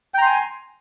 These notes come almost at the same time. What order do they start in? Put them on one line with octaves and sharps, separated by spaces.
G5 A#5 C6 G#5